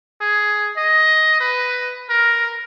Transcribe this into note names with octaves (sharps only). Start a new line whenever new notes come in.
G#4
D#5
B4
A#4